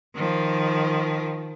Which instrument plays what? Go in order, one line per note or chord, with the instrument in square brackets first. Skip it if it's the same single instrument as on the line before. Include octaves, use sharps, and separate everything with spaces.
[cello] D#3 F3